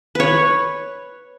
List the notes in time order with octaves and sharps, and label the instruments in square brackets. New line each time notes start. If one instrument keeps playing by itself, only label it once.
[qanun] B4 C#5